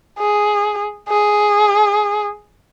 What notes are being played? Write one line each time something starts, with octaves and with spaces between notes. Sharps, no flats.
G#4
G#4